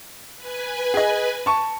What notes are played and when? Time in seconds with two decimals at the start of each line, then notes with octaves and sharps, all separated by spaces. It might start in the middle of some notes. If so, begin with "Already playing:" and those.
0.36 B4 G#5
0.94 G#4 D#5
1.46 A5 C#6